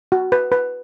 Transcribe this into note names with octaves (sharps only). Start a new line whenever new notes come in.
F#4
B4
B4